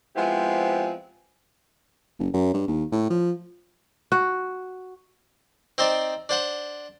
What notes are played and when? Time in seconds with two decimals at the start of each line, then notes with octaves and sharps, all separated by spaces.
0.15 F3 G#3 B3 C4 E4 G4
2.19 F#1
2.34 F#2
2.54 G2
2.68 D#2
2.92 A2
3.10 F3
4.12 F#4
5.78 C4 D#4 C5 D5
6.29 D4 C5 F#5